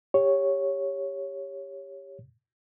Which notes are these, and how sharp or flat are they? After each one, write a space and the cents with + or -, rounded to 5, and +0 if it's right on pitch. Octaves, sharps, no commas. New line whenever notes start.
G4 +15 C#5 +0